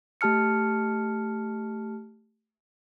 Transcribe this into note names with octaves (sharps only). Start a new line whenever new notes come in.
A3 G4 A5 F6 C#7